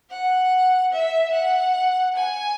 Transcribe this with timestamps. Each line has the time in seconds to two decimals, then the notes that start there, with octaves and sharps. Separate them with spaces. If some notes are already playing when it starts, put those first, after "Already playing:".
0.10 F#5
0.92 E5
1.33 F#5
2.16 G#5